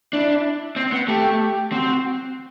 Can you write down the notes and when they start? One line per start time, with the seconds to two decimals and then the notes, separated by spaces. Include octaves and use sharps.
0.13 D4 E4
0.76 C4
0.92 B3
1.08 A3 G4
1.40 G4
1.72 C4 F#4